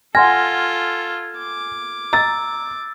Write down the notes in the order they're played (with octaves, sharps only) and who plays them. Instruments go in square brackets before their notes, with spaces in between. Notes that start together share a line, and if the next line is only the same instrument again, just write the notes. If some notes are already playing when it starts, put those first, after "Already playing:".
[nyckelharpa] F4 A4 [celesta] F#5 C6 A#6 [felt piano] G#5 [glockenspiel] F6 G#6
[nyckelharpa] D6
[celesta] A#5 [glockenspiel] E6 [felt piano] A6